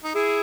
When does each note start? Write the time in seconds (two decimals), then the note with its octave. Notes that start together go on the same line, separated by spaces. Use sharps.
0.04 D#4
0.15 E4 G#4